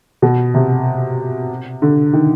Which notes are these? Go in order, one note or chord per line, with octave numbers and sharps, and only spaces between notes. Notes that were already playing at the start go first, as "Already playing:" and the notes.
B2
C3
D3
D#3